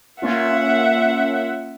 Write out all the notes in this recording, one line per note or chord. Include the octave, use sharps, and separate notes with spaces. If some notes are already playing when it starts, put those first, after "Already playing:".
A#3 C#4 F4 E5 F#5